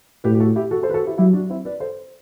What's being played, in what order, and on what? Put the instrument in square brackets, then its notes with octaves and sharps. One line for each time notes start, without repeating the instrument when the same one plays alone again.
[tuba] A2 [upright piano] G4 B4
[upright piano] G4
F#4 A4
E4 G4
F#4 A4
A4 C5
B4
F#4 A4
E4 G4
[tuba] F#3 [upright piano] E4 G4
[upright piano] D4 F#4
C4 E4
B4 D5
A4 C5